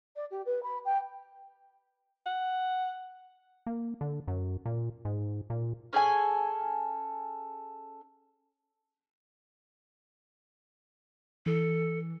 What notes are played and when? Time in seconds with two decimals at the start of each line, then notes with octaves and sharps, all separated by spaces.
0.16 D5
0.31 G4
0.46 B4
0.63 B5
0.85 G5
2.26 F#5
3.67 A#3
4.01 D3
4.28 F#2
4.66 A#2
5.05 G#2
5.50 A#2
5.93 C#4 G#4 A4 G#5
11.46 E3 A4